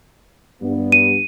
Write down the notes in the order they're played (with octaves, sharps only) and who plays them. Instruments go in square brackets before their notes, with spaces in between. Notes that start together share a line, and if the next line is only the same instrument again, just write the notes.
[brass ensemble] G2 B3
[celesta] D#7